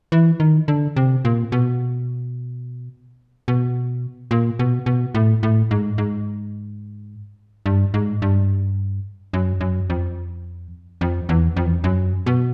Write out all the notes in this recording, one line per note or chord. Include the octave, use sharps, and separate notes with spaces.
E3
D#3
D3
C3
A#2
B2
B2
A#2
B2
B2
A2
A2
G#2
G#2
G2
G#2
G2
F#2
F#2
F2
F2
E2
F2
E2
F2
F#2
B2